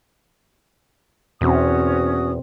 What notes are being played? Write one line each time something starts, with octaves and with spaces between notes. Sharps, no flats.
E2 B2 C4 C#4 F#4 D#6